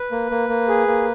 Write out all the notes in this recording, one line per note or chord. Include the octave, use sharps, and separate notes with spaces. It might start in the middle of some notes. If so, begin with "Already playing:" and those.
Already playing: B4
A#3
A#3
A#3
G#4
A#3